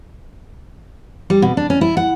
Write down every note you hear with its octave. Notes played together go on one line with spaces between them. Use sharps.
G3
B2
D4
C#4
E4
F#5